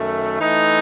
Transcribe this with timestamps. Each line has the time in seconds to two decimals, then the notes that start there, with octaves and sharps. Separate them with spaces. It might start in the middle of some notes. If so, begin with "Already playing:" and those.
Already playing: F#2 D#3 A3
0.41 E3 A3 D#4